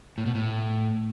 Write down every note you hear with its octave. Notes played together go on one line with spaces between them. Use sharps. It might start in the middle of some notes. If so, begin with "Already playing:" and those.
A2
B2
A2